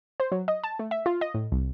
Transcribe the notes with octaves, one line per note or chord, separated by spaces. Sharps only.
C5
F#3
D#5
A5
A3
E5
F4
D#5
A2
C2